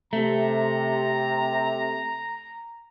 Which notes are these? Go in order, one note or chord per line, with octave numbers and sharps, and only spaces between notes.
C3 A3 A#5